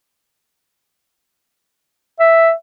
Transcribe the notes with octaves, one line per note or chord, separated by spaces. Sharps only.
E5